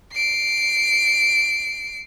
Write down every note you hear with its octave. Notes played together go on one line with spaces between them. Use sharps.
C7 D7